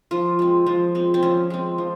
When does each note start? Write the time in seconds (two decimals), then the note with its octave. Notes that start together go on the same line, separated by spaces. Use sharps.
0.11 F3 F4
0.39 G#3 C4
0.66 F3
0.95 G#3 C4
1.14 C4
1.23 F3 C#4
1.50 G#3 C4
1.78 F3